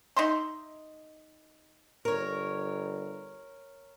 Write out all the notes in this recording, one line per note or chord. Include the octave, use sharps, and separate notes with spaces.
D#4 E5 C6
G1 A#4 C#5